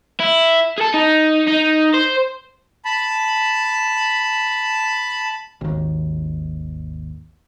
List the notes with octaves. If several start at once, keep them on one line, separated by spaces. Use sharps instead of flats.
E4
G#4 A4
D#4
D#4
C5
A5 B5
G#1 D#2